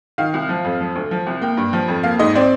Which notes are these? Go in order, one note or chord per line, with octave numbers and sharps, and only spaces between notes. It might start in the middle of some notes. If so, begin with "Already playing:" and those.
D#3 F5
C2
F3
F2
F3
D2
F3
C2
A#3 G5
G2
F3
F2
A#3 F5
G#2 D#5
C4 D5